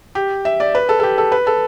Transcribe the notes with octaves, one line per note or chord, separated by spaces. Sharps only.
G4
E5
D5
B4
A4
A4
G4
A4
B4
A4